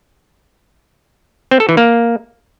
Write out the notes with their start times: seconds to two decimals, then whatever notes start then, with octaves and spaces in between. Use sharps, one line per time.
1.51 C4
1.60 A4
1.69 E3
1.77 A#3